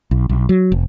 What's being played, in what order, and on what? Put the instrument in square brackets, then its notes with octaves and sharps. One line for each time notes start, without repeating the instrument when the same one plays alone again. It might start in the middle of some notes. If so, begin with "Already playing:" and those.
[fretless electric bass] B1
B1
F#3
F1